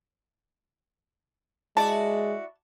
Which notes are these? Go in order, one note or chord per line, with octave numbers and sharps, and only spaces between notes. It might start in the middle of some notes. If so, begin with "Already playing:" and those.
G#3 E4 F#4 D5 A5